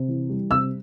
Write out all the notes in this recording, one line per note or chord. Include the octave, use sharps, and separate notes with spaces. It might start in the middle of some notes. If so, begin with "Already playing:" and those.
Already playing: C3
E3
G3
C3 E6